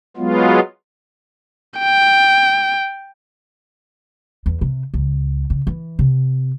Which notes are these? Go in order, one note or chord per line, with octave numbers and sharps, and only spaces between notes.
F#3 G#3 B3 F4
G5
E2
C3
C#2
C#3
E3
C3